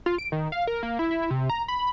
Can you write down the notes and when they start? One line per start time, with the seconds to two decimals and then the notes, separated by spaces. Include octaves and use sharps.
0.06 F4
0.18 D7
0.32 D#3
0.52 F5
0.67 A#4
0.83 A#3
0.99 E4
1.11 E4
1.30 C3
1.49 A#5
1.68 B5